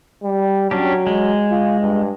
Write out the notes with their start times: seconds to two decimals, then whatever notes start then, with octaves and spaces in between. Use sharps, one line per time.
0.23 G3
0.71 F#3 C#4 D4 G4
1.07 G#3
1.51 F4
1.80 G2